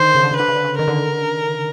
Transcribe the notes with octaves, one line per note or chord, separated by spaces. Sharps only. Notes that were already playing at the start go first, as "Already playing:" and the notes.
Already playing: D3 D#3 C5
C#3
D3
C#3
D3 B4
C#3
D3
C#3
D#3 A#4
D3